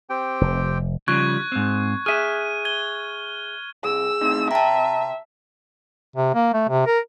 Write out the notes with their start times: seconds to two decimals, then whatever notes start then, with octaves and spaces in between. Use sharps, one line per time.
0.10 C4 G4 G5
0.41 F1
1.08 C#3 F3 G3 C#6 F#6 G#6
1.52 G#2 C4
2.06 G#4 E5 F6 D#7
2.65 G#6 G7
3.85 C2 G#4 E6
4.21 A2 C4 D#4
4.51 C3 E5 G5 A5 A#5
6.16 C3
6.34 A#3
6.53 A3
6.69 C3
6.86 A#4